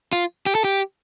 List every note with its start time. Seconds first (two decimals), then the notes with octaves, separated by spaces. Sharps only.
0.13 F4
0.46 G4
0.55 A4
0.64 G4